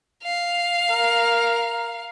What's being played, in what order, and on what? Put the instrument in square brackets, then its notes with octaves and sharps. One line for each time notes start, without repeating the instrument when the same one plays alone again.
[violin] F5
[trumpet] A#4